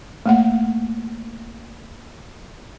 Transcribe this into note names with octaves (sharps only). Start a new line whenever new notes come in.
A3 A#3 F#5